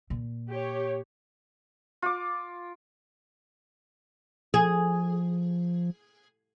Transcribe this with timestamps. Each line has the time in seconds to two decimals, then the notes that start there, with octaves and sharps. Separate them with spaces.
0.10 A#2
0.49 G4 C#5
2.02 F4 D6
4.54 F3 G#4